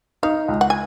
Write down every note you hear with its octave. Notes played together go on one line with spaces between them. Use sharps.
D#4 F5
C#2
F#5
G#5